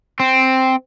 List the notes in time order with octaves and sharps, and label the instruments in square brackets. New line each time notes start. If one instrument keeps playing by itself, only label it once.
[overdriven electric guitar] C4